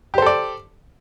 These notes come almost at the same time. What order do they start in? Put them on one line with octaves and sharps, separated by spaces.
G4 C5 A4 D5